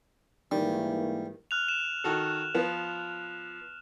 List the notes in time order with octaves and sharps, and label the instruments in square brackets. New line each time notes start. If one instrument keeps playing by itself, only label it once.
[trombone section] G#2 E3 A#3 [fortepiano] D#3 [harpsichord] G3
[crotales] F6 F#6 F7
E7
[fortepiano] D#3 F#4 A4
F3 B3